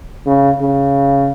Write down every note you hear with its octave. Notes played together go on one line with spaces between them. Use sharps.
C#3
C#3